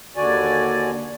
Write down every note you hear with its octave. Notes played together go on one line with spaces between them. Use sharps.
D#2 D3 F#4 D5 G#5